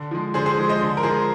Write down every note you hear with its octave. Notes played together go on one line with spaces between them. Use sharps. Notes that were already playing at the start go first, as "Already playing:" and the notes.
Already playing: D3
F3 G#3
D3 G#4 C5
G#4 C5
F3 G#3
C5 D#5
D3
A#4
F3 G#3 G#4 C5